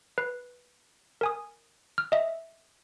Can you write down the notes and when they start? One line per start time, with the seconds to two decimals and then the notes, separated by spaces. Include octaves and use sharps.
0.18 B4
1.21 A#4 G#5 D#6
1.98 F6
2.12 D#5 E5